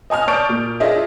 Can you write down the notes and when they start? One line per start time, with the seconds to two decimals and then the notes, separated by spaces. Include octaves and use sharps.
0.10 D#5 G#5 D#6 F6
0.28 D5 A5 C#6 G6 D7
0.49 A#2
0.80 D4 F4 G#4 D#5 E5